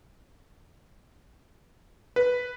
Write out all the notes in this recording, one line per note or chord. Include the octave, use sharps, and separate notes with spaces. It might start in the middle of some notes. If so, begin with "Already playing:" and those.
B4